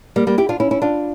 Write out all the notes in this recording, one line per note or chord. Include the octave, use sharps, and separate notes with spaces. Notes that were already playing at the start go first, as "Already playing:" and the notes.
G3 A#3
G3 A#3
E4 G4
D4 F4
C#4 E4
C#4 E4
D4 F4